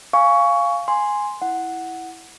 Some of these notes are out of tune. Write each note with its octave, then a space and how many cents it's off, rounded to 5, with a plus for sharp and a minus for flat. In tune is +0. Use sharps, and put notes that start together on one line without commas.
F5 -5 G#5 +0 C#6 +15
G#5 +0 C6 +0
E4 +0 F#5 +0